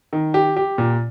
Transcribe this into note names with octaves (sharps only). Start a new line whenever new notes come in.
D#3
G4
G4
A#2